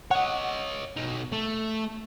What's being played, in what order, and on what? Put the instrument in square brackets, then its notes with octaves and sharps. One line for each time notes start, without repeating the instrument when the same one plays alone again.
[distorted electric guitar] C#5 D#5 [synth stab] F#5
[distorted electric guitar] B2 D#4
A3